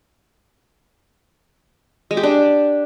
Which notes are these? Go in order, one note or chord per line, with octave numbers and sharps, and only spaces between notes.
G#3
G4
D4